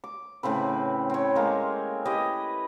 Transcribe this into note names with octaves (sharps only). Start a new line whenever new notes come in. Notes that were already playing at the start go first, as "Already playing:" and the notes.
D6
A2 C#3 C4 B4
C4 C#5
G#3 A#3
E4 G4 B4 D#5